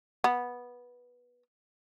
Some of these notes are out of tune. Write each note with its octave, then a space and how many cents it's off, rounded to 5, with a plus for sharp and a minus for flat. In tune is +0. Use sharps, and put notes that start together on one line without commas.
B3 -10